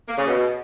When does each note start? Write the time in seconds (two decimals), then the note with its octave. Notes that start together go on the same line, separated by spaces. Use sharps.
0.08 A#3
0.18 C#3
0.27 B2